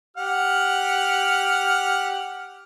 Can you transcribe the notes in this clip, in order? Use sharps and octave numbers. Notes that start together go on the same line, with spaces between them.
G4 F#5 F6